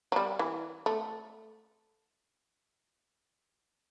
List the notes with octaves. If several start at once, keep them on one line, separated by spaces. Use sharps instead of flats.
F#3
G3
E3
A3